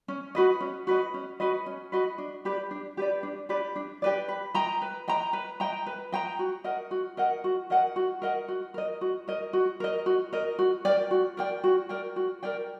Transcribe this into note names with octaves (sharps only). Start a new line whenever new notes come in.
C#4
F#4 B4 D#5
C#4
F#4 B4 D#5
C#4
F#4 B4 D#5
C#4
F#4 B4 D#5
D4
G4 B4 D5
D4
G4 B4 D5
D4
G4 B4 D5
D4
G4 B4 D5
B4
D#5 G5 A#5
B4
D#5 G5 A#5
B4
D#5 G5 A#5
B4
D#5 G5 A#5
F#4
A#4 D#5 F#5
F#4
A#4 D#5 F#5
F#4
A#4 D#5 F#5
F#4
A#4 D#5 F#5
F#4
A#4 D#5
F#4
A#4 D#5
F#4
A#4 D#5
F#4
A#4 D#5
F#4
A#4 D5 G5
F#4
A#4 D5 G5
F#4
A#4 D5 G5
F#4
A#4 D5 G5